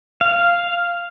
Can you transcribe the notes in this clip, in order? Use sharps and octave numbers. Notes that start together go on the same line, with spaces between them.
F5